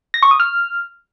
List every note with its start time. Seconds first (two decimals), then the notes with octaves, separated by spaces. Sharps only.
0.14 A#6
0.23 C#6
0.31 D#6
0.40 F6